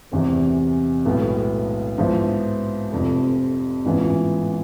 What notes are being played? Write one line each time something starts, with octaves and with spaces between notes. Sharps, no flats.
F1 E2 C3 E3
B1 A2 G#3 B3
G#2 F3 B3 E4
F1 F2 C3
A1 G#2 E3 B3 F4